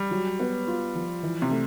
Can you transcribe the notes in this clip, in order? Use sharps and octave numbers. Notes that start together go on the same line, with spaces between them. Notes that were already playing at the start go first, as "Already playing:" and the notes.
Already playing: G3
F#3
B3
F4
F3
E3
C3
A3